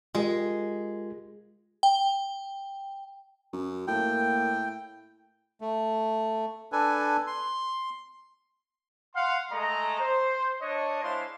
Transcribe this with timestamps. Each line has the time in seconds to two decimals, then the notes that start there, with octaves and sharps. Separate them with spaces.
0.15 G#3 F4 G4 A#4
1.83 G5
3.53 F#2
3.88 A2 A#3 G5
5.61 A3
6.72 D4 A4 B4 G#5
7.27 C6
9.14 F5 F#5 C6
9.51 G#3 A3 D#5 A#5
9.99 C5
10.61 D4 C#5 D#5
11.03 G#3 D4 E4 C5 F5 C6